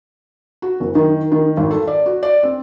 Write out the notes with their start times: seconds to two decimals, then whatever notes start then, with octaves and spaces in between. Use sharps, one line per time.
0.62 F#4
0.80 F#1
0.95 D#3
1.32 D#3
1.57 G#1
1.71 A4
1.87 D5
2.06 F#4
2.23 D5
2.43 C4